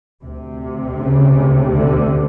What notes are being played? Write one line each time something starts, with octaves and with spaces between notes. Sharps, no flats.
D2 C3
C#3
D3